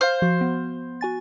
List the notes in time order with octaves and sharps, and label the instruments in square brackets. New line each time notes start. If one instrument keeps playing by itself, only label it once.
[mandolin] C5 [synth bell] F5 F6
[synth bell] F3 F#4
B3
F#4 G#5 A6